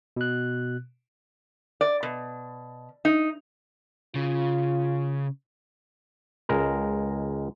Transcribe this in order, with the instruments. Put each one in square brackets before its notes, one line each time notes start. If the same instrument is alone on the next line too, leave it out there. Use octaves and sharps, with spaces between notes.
[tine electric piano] B2 F#6
[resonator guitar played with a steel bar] D5
B2
D#4
[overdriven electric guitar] C#3 [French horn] F4
[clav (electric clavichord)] C#2 G#3 A#4